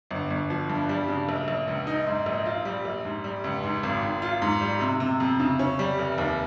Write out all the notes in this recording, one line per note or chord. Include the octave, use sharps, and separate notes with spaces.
G1
G1
F3
G2
G3
C#3
A#1
A#1
C#2
D#4
G#2
A#1
F4
G3
A#1
G#2
G3
C#2
G#2
G#1
G#2
F4
G#2
G3
C3
C3
F2
C#3
C#4
G3
F1
D#2